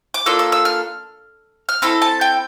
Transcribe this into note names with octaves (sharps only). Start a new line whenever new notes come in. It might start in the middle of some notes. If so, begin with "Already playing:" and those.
D6
A#3 D4 F4 A4 E6
E6
E6
F6
F6
C4 E4 A4 E6
A5
G5